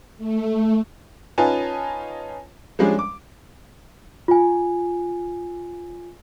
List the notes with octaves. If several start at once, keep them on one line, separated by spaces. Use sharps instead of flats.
A3
C#4 D#4 F4 B4 G#5 A5
F3 G3 G#3 C#4 D4
D6
F4 G#5